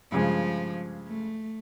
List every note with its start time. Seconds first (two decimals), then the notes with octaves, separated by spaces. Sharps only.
0.12 G2 C#3 F3 G#3
1.08 A3